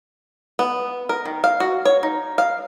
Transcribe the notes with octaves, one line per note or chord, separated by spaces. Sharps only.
B3
A#4
D#3
F5
F#4
C#5
D#4
F5